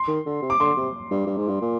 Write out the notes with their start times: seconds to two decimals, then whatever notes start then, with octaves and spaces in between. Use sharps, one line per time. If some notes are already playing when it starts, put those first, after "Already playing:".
Already playing: C6
0.08 D#3
0.26 D3
0.42 C3
0.50 D6
0.60 D3 C6
0.77 C3
1.11 G2
1.27 G2
1.37 G#2
1.48 G2
1.61 A#2